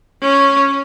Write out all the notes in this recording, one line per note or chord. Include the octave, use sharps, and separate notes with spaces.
C#4